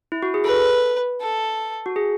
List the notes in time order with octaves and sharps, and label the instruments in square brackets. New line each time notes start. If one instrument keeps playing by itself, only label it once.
[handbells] E4
F#4
G#4
[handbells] A4 [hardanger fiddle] B4
[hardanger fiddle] A4
[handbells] F#4
G#4